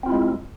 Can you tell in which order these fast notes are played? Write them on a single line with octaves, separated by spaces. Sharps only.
C4 F4 E4 G#3